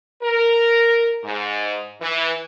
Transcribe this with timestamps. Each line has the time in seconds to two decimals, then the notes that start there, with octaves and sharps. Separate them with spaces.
0.23 A#4
1.24 G#2
2.02 E3